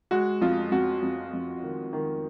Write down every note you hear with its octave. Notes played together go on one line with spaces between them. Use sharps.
G#3 F#4
F2 F4
F2 F#4
F2
F2
D#3
D#3